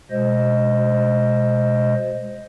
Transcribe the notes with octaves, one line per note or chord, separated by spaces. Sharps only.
B2 G#3 C5 D#5